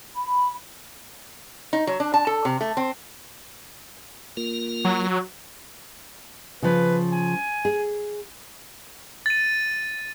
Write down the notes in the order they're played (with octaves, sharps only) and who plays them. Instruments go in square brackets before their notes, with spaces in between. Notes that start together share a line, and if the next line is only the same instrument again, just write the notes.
[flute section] B5
[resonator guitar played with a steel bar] D#4
F#3
D4
A5
A4
C3
A3
C4
[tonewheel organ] A#3 F4 A#4
[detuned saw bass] F#3
[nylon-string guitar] C#3 F3 [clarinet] B4
[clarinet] G#5
[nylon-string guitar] G#4
[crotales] A6 D#7